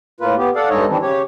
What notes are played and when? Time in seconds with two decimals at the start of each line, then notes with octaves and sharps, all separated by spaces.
0.20 A2 A#3 F4 B4
0.38 B3 G4
0.56 A4 D5 F5 F#5
0.70 G2 G#3 D#4 A4 C#5 D#5
0.89 D#3 E3 G3 C4 D4
1.02 C#3 G4 C#5